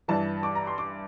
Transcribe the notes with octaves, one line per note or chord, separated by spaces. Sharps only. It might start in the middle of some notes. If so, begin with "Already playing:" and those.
G2 E3 A5
D6
A#5
C6
D6